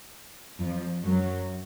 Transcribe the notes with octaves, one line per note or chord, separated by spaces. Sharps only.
F2 F3
F#2 F#3